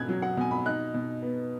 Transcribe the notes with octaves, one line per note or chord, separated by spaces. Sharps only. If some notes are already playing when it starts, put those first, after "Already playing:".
Already playing: B2 C#4 F#6 G#6
F#3
F#5
B2 G#5
B5
D#4 F#6
B2
B3